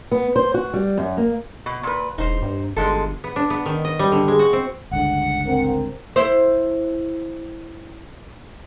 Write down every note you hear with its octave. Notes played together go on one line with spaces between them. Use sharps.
B3
C5
F#4
G3
F#2
A#3
B2
A#2 B4
E1 D#4 C5
G2
G1 G#2 G#3 A4
B3
D4
B3
D#3
D#5
G3
D3
G#3
F#4
C4
G1 C#2 D3 F#5
C4 A#4
E4 C5